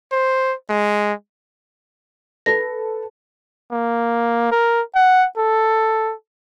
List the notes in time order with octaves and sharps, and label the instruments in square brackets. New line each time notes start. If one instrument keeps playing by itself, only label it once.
[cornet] C5
G#3
[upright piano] A4 B4 [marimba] A#6
[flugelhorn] A#3
A#4
F#5
A4